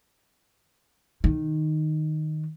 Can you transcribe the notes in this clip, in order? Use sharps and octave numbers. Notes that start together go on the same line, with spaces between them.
D#3